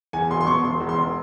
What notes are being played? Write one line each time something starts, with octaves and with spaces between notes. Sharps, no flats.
E2 G#5
E1 C6
C6
B2 C#6
E1 C6
E2
C6
E1